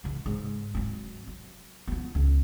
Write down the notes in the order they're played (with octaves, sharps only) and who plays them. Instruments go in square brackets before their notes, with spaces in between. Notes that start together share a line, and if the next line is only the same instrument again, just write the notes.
[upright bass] C#3 E3
G#2
F#3 C4
F#3
F3 B3
C#2